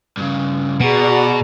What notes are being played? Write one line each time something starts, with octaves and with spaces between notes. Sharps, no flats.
G2 C#3
B2 F#4 G#4 D5 F#5 A#5